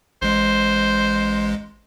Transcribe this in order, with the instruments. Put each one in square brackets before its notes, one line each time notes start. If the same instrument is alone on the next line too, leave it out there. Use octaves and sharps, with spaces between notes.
[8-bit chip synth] A1 G#3 [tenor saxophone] C5